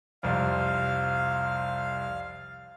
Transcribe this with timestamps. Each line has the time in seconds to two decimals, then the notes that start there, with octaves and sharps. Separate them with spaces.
0.23 C2 F2 F5